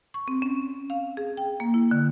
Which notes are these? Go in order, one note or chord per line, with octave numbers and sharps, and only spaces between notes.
C#6
C4
C#4
F5
G#4
G5
A#3
E4
D3